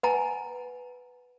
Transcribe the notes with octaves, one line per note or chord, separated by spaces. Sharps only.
B4 F#5 G#5 A#5